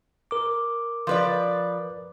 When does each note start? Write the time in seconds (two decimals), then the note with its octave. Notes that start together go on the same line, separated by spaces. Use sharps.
0.31 A#4 D6
1.07 F3 B4 D5